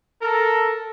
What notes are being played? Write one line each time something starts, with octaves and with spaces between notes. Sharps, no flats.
A4 A#4